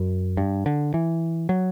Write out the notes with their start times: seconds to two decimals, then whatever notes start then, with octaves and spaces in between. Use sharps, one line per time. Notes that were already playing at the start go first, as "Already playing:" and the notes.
Already playing: F#2
0.37 G2
0.66 D3
0.94 E3
1.49 F#3